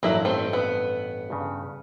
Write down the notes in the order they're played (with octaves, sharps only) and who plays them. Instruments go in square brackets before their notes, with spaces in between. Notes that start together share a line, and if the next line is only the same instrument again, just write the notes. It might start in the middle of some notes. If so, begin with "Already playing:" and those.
[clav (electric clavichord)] A1 G2 [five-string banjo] F#3 A#3 E4
[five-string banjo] A3 C4
B3
[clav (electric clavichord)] G2 C#3